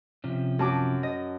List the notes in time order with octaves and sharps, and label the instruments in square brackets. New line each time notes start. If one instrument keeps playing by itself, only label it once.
[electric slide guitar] C3 F3 C#4
[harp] F#2 A5 D6
D#5